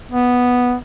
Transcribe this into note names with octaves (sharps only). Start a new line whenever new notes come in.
B3